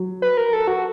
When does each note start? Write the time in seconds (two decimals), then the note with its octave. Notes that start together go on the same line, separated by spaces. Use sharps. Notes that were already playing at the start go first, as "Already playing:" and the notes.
Already playing: F#3
0.22 B4
0.37 A#4
0.53 A4
0.67 F#4